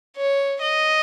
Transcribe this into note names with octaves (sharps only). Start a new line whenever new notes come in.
C#5
D#5